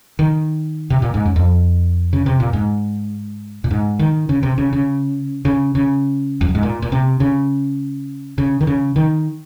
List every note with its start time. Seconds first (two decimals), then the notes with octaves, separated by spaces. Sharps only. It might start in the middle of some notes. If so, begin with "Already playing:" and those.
0.19 D#3
0.90 C3
1.02 A#2
1.14 G#2
1.25 F#2
1.36 F2
2.13 C#3
2.26 C3
2.40 A#2
2.53 G#2
3.64 A#2
3.71 G#2
3.99 D#3
4.29 C#3
4.43 C3
4.58 C#3
4.73 C#3
5.45 C#3
5.75 C#3
6.41 F2
6.48 F#2
6.55 G#2
6.63 A#2
6.82 A#2
6.92 C3
7.20 C#3
8.38 C#3
8.61 D#3
8.67 C#3
8.96 D#3